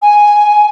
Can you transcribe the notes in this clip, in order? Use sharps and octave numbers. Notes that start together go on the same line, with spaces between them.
G#5